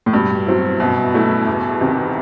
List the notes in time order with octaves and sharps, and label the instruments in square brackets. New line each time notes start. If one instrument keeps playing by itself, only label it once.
[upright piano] A2
[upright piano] G2 [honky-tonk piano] B2
[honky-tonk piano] F#3 C4 E4
[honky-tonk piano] F#2 [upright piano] B2
[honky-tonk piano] F#3 A3 E4
E2
C3 D#3